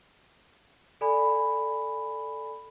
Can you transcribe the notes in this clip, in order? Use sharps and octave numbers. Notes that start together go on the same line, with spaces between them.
A4 D5 G#5 B5